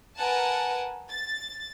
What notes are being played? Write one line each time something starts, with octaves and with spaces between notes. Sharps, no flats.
A#4 B4 F#5 G#5 A5
A6